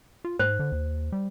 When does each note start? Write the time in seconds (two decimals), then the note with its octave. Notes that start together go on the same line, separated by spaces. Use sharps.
0.25 F4
0.39 G#2 C5
0.59 D3
0.72 D#2
1.12 G3